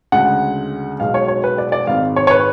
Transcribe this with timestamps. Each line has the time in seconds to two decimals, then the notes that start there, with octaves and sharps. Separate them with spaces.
0.12 D2 C#3 G#3 F#5
1.00 B1 B2 G#3 F5
1.14 C#5
1.28 C#5
1.44 B4
1.58 D5
1.72 D5
1.87 G#1 G#2 G#3 F5
2.16 C#5
2.27 C#5
2.31 B4